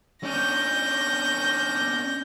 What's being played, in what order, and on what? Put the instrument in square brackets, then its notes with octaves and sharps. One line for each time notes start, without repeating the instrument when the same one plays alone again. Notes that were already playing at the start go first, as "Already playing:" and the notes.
[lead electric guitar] C#4 D4 [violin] G6 A#6